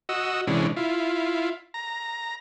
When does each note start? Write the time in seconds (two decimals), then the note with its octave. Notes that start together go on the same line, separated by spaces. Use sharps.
0.09 F#4 D#5 E6
0.47 C3 E3 G#3 C#4 D4
0.77 E4 F4
1.74 A#5